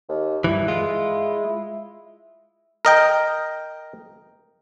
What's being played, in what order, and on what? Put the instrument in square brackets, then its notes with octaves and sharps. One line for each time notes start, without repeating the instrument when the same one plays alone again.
[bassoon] D#2
[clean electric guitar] G2 E3 [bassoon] E4
[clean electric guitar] G#3 F4
[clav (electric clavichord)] A#4 D#5 G5